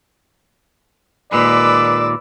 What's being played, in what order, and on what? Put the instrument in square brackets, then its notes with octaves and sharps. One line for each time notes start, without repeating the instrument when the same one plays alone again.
[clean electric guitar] D#2 A#2 G#3 [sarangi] B4 [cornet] D5 [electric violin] D6 E6